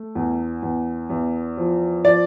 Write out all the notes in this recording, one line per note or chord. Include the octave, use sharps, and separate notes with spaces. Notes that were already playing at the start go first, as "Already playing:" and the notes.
Already playing: A3
E2
E2
E2
F3
F3 D5